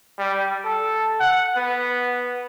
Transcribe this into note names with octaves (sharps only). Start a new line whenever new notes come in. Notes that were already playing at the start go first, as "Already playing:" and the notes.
G3
A4
F#5
B3